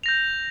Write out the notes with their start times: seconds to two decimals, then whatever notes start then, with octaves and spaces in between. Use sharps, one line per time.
0.03 G6 A#6 F7